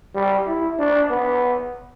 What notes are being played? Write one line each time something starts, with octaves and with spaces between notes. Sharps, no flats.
G3
E4
D4
B3